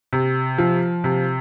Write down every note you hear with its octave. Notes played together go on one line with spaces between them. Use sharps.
C3
F3
C3